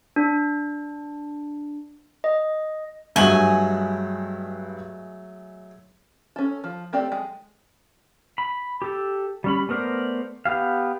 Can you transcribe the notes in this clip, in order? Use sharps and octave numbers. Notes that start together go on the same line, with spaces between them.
D4
D#5
G2 F#3 G#3 A3 G#5 F#7
C#4 A4
F3
A3 C4 G4 A4 D5
G#3
B5
G4 A4
G3 C#4 B5
A3 B3 A#4 C5 D5
B3 G4 F5